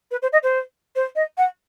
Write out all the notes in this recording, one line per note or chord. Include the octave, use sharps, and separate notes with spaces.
B4
C5
D#5
C5
C5
D#5
F#5